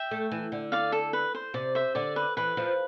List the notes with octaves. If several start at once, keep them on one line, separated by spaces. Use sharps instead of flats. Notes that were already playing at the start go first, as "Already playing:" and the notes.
Already playing: E5 G5
A3
E3
D3
D5 F5
A4
B4
C5
C3 D5
C5 E5
D3 D5
B4
E3 B4
F3